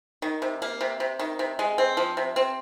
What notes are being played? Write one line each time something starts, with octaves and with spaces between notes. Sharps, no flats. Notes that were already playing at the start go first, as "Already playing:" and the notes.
D#3
C3
A#3
C3
C3
D#3
C3
G#3
C4
F3
C3
C4